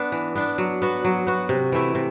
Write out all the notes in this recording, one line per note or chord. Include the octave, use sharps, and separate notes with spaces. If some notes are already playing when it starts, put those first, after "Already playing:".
Already playing: B3 D4
E3
B3 D4
F#3
B3 F#4
F#3
B3 F#4
C3
E3 A3 E4
C3